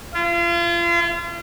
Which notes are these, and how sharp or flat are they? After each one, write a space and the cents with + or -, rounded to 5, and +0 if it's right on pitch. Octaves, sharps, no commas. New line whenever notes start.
F4 -35